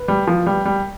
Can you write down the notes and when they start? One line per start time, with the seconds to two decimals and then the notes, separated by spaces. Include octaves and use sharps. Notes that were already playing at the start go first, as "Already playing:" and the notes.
Already playing: B4
0.08 G3
0.27 F3
0.47 G3
0.66 G3